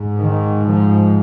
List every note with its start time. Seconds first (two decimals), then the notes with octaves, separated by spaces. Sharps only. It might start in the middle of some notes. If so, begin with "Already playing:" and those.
Already playing: G#2
0.19 D#3
0.66 F3